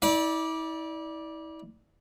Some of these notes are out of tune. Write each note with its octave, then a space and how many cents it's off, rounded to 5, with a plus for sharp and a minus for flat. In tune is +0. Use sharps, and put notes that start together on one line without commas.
E4 -40 D5 +0